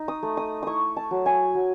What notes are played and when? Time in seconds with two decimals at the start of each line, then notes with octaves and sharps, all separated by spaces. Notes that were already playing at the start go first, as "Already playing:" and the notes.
Already playing: D#4
0.08 D#6
0.23 A3
0.37 D#6
0.63 E4 C#6 D#6
0.97 A5
1.11 F#3
1.26 G#5
1.55 F#3